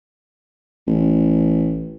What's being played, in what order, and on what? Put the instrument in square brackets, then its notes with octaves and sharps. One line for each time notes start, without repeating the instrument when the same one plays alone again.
[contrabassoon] A1